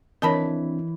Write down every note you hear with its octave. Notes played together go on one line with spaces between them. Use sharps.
E3 C4 D4 A#4 C#5 D#5 A5 B5